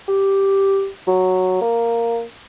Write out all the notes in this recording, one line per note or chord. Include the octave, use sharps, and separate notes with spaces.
G4
F#3
A#3